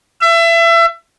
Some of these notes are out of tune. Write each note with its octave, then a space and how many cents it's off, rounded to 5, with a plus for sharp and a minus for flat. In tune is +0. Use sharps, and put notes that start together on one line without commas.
E5 +30